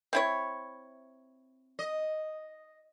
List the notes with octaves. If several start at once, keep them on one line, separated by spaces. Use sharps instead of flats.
C4 E4 C#5
D#5